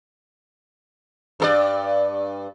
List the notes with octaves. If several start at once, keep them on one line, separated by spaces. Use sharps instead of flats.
G2 A4 D5